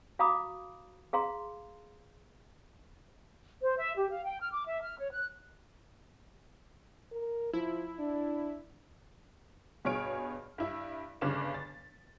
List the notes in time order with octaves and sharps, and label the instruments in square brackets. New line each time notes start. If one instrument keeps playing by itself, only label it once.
[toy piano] F#4 F5 A#5 B5 D6 D#6
G#4 F5 A#5 C6
[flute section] C5
E5
G4
F5
G5
F6
D6
E5
F6
C#5
F#6
[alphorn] A#4
[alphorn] F3 [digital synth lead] E4
[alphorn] D4
[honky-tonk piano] G2 B2 G#4 C#5 F6 D7
G2 E4 E5
G1 G2 C#3 B4 D6 E7
A6